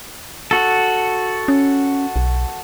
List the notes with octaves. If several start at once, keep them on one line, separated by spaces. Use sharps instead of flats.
F#4 A4
C#4
B1